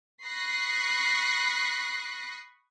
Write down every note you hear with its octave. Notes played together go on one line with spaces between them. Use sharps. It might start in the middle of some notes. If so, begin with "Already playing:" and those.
B5 C#6 D#6 F#6 A#6 C7